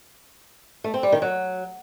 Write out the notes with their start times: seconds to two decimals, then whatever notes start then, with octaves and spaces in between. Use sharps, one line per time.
0.84 A3
0.94 C4
1.03 G3
1.12 D#3
1.22 F#3